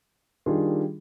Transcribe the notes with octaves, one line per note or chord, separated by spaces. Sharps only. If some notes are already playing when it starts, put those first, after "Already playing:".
D#3 G3 D4 F4 G#4